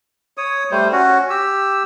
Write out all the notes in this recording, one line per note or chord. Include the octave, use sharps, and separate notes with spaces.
C#5 D#6
G3 A3 C5
C#4 F#4
G4 E6